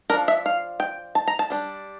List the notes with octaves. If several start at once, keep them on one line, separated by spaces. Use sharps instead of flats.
F3 A3 D4 A#4
E5
F5
G5
A5
A#5
A5
G3 D4